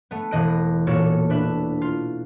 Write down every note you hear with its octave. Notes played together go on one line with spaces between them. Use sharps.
A3 B3
E1 E3 D#5 F#6 D7
A#2 A#3 F#4 A4 C#5
D4 B4 E5
F4